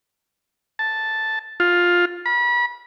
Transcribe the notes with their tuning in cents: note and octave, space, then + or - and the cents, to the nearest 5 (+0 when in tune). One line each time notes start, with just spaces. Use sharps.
A5 +0
F4 +10
B5 -30